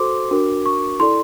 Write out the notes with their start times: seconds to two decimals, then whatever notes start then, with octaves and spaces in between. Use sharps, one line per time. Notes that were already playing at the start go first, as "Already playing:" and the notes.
Already playing: F#4 A4 C5 C6 D6
0.31 D4 F#4 A#4
0.66 C#6
0.99 E4 A4 D5 C6